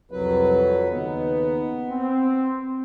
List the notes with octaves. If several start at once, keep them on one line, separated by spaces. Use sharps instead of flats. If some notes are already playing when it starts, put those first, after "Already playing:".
C2 F2 F#3 B4
D#2 C#3 B3 D#4
C4